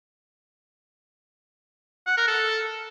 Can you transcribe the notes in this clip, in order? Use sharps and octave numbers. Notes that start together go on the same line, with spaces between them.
F#5
A#4
A4